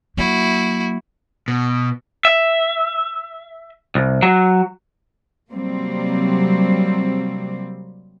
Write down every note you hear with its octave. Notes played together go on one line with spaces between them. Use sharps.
F#3 A#3 E4 F#4
B2
E5
C2
F#3
C3 F#3 G3 A#3 C4